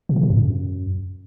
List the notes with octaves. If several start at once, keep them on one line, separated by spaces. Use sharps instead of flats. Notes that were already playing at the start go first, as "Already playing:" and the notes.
B2
C3
A#2
F2
F#2